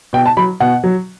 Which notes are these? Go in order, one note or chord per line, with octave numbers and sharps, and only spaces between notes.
B2 G5
A5
F#3 B5
B2 F#5
F#3